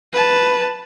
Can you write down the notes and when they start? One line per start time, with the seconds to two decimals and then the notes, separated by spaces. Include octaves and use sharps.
0.13 B4 A5